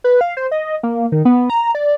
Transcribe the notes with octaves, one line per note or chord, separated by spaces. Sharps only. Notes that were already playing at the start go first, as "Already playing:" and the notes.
B4
F5
C5
D#5
A#3
D#3
B3
A#5
D5